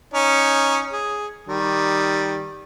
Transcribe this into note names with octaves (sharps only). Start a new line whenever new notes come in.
C#4 D#4
G#4
D#3 G3